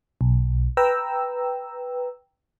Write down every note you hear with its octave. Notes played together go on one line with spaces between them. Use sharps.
B1
B4 G5 A#5 E6